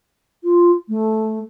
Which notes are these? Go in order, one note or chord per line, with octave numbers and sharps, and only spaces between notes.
F4
A3